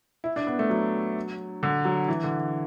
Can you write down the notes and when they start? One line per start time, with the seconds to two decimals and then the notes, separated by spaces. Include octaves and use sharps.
0.24 E4
0.36 D4
0.47 B3
0.59 A3
0.70 F#3
1.63 D3
1.85 F#3
2.08 E3
2.23 D3